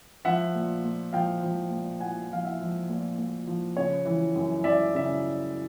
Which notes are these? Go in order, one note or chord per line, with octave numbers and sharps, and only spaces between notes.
F3 E5 F#5
A#2
A#2
F3 F5 G5
F3
A#2
A#2 F#5 G#5
F3 F5
E5 F#5
F3
A#2
A#2
F3
C#3 C#5
E3
F#2
F#2 D5 E5
C#3 E5